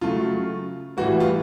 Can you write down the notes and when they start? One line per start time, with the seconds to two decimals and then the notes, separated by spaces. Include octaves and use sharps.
0.01 C#3 F#3 A3 F4
0.97 A2 E3 G3 F#4
1.20 F4